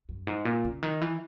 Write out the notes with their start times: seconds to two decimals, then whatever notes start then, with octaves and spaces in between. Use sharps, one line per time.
0.09 F#2
0.27 G#2
0.45 A#2
0.65 C#3
0.83 D#3
1.01 E3